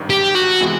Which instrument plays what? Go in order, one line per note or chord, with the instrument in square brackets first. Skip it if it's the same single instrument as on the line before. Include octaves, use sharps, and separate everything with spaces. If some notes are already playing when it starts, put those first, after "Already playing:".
Already playing: [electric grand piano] G#1 G2 D#3
[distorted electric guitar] G4
F#4
[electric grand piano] C3 E3 G#3 B3